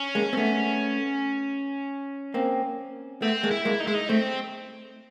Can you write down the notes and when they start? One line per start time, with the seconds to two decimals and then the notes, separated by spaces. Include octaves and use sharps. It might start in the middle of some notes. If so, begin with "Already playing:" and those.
Already playing: C#4
0.15 G#3 A#3
0.33 C4
0.37 A3 B3
2.34 A#3 C4
3.22 A3 B3 C4
3.44 G#3 A#3
3.51 E4
3.65 G#3 A#3
3.80 D#4
3.87 G#3 E4
3.94 D#4
4.09 A3 C4